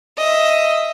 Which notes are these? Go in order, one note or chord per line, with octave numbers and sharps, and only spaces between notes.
D#5 E5